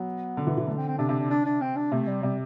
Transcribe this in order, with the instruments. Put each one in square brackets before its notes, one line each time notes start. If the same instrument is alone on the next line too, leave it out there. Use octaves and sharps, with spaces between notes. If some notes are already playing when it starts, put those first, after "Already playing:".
Already playing: [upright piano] F#3 [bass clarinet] B3
[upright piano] D3
E3
E3
[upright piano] D3 [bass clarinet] A3
[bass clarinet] C4
C4
[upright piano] C3 [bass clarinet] D4
[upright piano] C3 [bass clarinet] D4
[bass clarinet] D4
D4
D4
C4
D4
[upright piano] C3 [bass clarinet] A3
[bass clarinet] G3
[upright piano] C3 [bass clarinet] G3